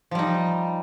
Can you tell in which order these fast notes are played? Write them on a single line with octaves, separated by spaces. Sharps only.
F3 G3 D#4